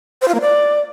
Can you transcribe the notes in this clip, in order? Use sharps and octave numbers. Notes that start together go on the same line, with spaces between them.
C5
F4
A#3
D5